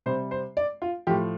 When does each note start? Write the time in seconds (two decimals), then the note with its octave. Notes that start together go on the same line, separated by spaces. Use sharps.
0.06 C3 G3 C5
0.31 C5
0.57 D5
0.82 F4
1.07 A2 F3 G4